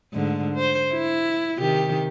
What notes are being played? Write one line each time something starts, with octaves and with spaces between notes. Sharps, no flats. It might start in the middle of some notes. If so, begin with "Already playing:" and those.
G#2 D3 A3
C5
E4
C3 D#3 G4